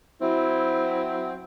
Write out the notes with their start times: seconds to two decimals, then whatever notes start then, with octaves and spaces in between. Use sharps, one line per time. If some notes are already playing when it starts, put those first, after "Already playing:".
0.21 F#3 C4 E4